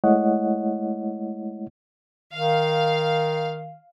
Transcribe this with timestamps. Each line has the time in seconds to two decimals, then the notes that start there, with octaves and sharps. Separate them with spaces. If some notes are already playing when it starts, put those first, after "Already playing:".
0.04 G#3 A3 E4 C#5 D#5 F#5
2.33 D#3 F5